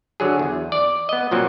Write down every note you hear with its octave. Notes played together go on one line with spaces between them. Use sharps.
D3 F#3 G#4
E2
D5
B3 D#5
A#2 F3 F#3 C4